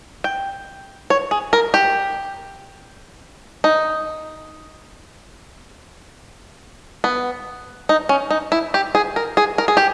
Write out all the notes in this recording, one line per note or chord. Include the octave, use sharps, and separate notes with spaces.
G5
C#5
G#4
A#4
G4
D#4
B3
D#4
C#4
D#4
E4
G4
G#4
A#4
G#4
A#4
G#4
G4